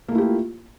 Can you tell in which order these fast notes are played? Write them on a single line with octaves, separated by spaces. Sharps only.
A#3 A3 E4 G4 F4